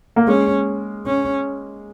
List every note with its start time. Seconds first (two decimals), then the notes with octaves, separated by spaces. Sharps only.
0.16 A#3
0.27 G#3 C#4
1.07 C#4